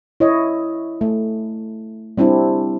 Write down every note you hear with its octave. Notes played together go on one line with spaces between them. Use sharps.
E4 C#5 D#5
A3
G3 C4 D4 E4